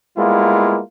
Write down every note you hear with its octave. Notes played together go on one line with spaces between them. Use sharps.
G3 G#3 A#3 B3 E4 F4